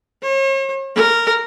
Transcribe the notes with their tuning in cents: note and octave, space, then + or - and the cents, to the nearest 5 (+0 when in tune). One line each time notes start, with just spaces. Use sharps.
C#5 -45
A#4 -10